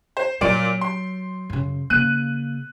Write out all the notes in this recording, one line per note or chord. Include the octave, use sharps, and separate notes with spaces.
C5
A#2 F#3 D5 D7
C6
F#2 C#3
C#3 A#3 F#6 D#7